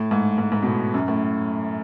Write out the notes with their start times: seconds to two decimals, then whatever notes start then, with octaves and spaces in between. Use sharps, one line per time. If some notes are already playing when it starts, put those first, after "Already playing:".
Already playing: A2
0.11 G#2
0.38 G#2
0.52 G#2
0.62 B2
0.66 A2
0.94 F#2
1.08 A2